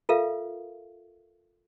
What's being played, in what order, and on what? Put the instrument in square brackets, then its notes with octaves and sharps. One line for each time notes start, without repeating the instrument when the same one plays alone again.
[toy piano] F4 A4 A#4 E5 F5